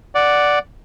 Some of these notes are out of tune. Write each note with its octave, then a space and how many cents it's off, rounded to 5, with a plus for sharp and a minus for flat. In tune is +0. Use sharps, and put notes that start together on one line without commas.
D5 +0 F#5 +0